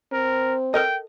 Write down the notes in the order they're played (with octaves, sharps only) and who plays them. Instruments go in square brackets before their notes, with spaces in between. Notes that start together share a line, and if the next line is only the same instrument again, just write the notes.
[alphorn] C4 [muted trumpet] A#4
[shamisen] A4 A#4 D#5 [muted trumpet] G5